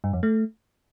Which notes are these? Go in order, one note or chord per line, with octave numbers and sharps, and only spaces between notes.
G2
F2
A3